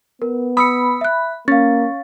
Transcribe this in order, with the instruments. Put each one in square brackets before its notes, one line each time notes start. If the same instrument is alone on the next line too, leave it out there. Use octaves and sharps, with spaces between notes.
[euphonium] B3 [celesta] A#4
[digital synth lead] B5 [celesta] D#6 E6 C#7
[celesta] E5 F#6
[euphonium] A#3 [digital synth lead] C#4 [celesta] F5 A6